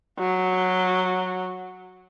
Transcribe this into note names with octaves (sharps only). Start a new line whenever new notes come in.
F#3